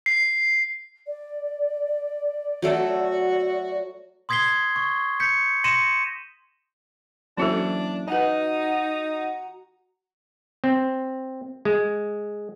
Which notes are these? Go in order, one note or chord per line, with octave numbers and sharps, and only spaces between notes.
C7
D5
F#3 A3 F#4 A4
C6 D#6 G#6 B6 C7 G7
C#6
G6 B6 C#7
C6 A#6 C#7 D#7 E7
E3 F#3 A#3 C#4 D4 E4 F#4 A4
D#4 F#4 B4 D#5 F#5 G#5 A#5
C4
G#3